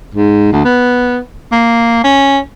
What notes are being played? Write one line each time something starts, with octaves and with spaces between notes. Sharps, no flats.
G#2
D2
B3
A#3
C#4